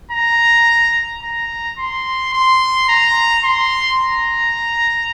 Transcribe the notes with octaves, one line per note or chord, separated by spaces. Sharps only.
A#5
A#5
C6
C6
A#5
C6
A#5